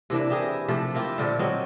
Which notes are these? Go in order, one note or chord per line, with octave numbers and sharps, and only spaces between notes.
C3 E3 A#3 D4
E4 G4 G#4 A#4
C3 F3 A3
A#3 E4 F4 G4
A#2 D3 F3
F#3 A#3 C4 D#4